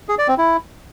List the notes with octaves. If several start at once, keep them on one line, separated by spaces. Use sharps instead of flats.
G#4
D5
C4
E4